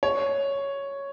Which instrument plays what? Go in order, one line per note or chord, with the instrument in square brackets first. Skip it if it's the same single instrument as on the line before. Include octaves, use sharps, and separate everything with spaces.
[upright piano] C#5